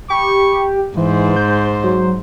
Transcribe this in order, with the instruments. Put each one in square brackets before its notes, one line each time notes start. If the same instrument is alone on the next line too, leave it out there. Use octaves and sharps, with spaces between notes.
[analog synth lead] G4 [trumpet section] B5 C#6
[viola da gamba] G#2 [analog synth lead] E3 [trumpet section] C5
[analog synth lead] G6
F#3